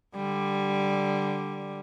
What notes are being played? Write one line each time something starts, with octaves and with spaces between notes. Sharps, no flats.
D3 G3